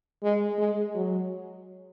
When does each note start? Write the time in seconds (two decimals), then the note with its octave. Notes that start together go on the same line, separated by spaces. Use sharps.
0.23 G#3
0.59 G#3
0.95 F#3